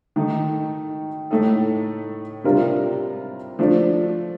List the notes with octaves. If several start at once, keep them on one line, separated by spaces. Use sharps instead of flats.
D#3 A3 D#4
A2 A3 D#4 A4
C3 G3 D4 F4 A#4
F3 A3 D4